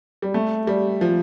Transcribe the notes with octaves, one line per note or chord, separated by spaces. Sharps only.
G3
A3
G3
F3